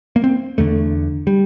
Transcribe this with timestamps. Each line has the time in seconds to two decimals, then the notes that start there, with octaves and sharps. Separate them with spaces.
0.16 A#3
0.24 C4
0.58 E2 D3 A3
1.27 G3